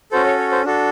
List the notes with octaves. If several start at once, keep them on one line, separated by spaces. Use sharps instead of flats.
C#4 F#4 A4 C5
C#5
C#5
C5
D4 F#4 A4